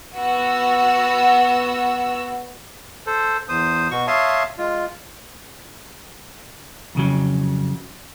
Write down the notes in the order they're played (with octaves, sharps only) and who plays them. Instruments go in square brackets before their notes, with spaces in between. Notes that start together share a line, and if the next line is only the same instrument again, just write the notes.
[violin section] B3 F#4 E6
[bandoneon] A4 C5
E2 C5 D#6
B2 F#4 C#6
C#5 E5 F5 A5 C6 D#6
G#3 F4
[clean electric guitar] F2 C#3 F#3